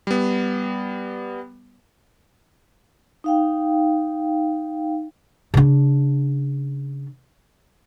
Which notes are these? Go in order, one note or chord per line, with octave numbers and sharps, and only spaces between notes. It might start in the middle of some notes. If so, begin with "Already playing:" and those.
G3 B3
D#4 F5 G5
C#3 D4